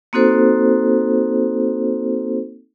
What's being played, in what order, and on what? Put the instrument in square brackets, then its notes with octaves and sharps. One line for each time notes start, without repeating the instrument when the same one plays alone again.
[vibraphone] A#3 C4 D#4 F#4 A4 C5